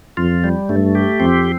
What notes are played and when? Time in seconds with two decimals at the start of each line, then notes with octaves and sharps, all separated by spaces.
0.17 F2 F4
0.44 G3
0.69 G2 A3
0.95 G4
1.20 F2 C4